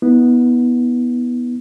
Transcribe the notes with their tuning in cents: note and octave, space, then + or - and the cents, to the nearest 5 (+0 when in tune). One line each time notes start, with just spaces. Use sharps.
B3 -10 E4 -40